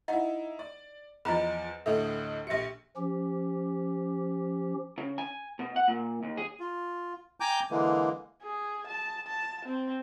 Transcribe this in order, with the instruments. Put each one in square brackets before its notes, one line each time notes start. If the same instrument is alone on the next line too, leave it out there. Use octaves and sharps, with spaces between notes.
[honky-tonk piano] D#4 E4 [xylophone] D#5 F#5
[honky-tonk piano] D5
[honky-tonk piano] E2 F3 [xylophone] D#5 A#5 B5
[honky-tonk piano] D2 A2 D#5 [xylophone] A4 E5
[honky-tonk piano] A#1 C#7 [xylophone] G4 E5 A#6
[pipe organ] F3 C#4 G4
[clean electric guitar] C#3
G#5
B2
F#5
A#2
D#2
G#4
[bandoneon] F4
G5 G#5 A#5 D6 G6
D3 E3 G#3 A#3
[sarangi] G#4
A5
A5
C4